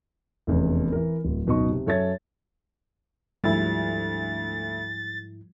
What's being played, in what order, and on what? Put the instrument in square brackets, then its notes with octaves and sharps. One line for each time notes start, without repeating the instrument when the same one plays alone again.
[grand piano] F1 E2 C#4
E3 A#4
D1
D1 F#2 B2 D#4 D#5 C#6
C3
F#2 A4 C#5 E5 G#6 A6
[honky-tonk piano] D2 [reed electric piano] G#2 E4 [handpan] F3 G3 [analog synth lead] A6